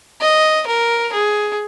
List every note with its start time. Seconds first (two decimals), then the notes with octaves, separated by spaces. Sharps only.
0.21 D#5
0.67 A#4
1.13 G#4